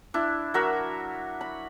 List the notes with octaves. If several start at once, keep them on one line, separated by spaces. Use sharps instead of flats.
D4 E4
F#3 F#4 A#4 E5
B5